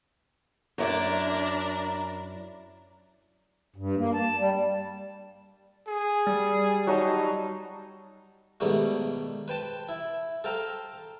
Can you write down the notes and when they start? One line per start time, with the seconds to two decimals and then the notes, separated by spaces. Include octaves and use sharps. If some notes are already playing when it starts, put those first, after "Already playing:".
0.78 F#2 D4 E4 A#4 D5
3.76 G2
3.98 A#3
4.14 A5
4.38 G3
5.87 G#4
6.27 G3
6.87 F#3 D#4 A5
8.60 G#2 B2 D#3 G3 A3
9.48 B4 C5 G5 A5
9.89 E4
10.44 A4 C5 F5 G5 A#5